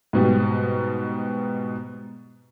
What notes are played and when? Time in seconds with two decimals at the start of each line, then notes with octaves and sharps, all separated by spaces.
0.13 G#2 B2 G3